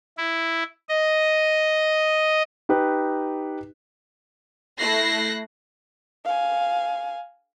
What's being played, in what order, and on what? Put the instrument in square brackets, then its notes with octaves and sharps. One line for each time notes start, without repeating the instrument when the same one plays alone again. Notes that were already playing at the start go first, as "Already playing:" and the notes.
[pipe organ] E4
D#5
[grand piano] D#4 G4 B4
[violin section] A3 E4 F#6 A#6 C7
[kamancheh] F5 G#5